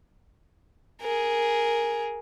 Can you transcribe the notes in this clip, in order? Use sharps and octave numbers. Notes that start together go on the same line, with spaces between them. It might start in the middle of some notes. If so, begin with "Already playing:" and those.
G#4 A#4